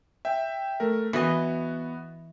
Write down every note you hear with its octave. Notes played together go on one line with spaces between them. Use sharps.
E5 G5
A3 A#4
E3 B3 F#4 D#5